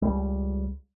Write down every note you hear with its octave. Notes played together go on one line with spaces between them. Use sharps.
C#2 G3